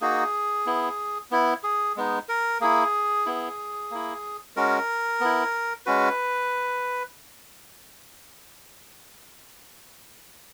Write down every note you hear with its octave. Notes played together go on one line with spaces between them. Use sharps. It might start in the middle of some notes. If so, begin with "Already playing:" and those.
A#3 D#4 F#4 G#4
B3 E4
B3 E4
G#4
G#3 B3 D#4
A#4
A#3 E4 G#4
B3 E4
A#3 E4
G#3 C#4 F#4 A#4
B3 E4
G#3 C#4 F#4 B4